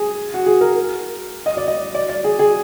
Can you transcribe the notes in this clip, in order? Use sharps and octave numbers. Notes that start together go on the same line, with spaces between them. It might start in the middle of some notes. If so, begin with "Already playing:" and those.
Already playing: G#4
F#4
G#4
A#4
D#5
D5
D#5
D5
D5
G#4
G#4